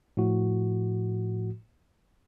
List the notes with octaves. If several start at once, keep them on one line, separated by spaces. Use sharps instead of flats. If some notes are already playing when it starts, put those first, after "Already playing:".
A2 F3 F#4